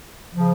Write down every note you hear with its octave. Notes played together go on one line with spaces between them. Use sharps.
C#3 F3